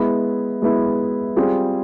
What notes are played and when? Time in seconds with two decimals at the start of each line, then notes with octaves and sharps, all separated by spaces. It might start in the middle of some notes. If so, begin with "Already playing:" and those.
Already playing: G#3 B3 E4
0.62 G#3 B3 E4
1.36 G3 C4 F4 G#4